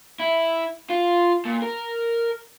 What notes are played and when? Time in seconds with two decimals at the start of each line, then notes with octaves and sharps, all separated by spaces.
0.20 E4
0.90 F4
1.45 A#2
1.62 A#4